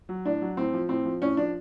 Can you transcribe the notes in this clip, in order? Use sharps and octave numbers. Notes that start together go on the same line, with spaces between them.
F#3
A2 D4
F#3
A2 C4
F3
A2 C4
F3
A2 C#4
F3 D4